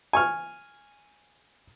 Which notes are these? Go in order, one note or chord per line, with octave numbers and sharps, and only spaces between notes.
G#5 C#6 F6